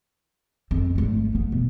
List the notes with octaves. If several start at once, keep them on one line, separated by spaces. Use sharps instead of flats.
F2 C4
G#1 A3
A3 B3
B2